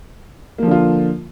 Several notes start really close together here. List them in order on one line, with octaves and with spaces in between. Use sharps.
A#3 F3 D3 F4